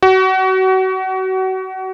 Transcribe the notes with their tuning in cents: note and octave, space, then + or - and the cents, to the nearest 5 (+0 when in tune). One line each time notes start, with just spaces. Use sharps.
F#4 +30